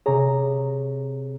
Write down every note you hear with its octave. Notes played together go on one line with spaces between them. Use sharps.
C3 G#4 C#5 A#5